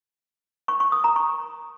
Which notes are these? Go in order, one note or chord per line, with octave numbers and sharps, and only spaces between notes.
C#6
C#6
D#6
A#5
C#6